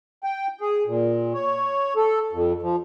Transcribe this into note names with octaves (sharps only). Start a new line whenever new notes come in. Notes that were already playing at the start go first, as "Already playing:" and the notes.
G5
G#4
A#2
C#5
A4
F2
F3